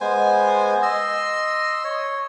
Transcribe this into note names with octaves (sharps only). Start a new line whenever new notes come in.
G#3 B3 C5 G#5
D#5 C6 E6
C#5